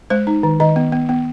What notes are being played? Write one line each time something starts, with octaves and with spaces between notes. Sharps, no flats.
G#3 C5
D#4
D#3
D#3 D#5
B3
B3
B3